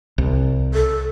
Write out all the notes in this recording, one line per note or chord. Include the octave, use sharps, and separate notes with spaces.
C2
A4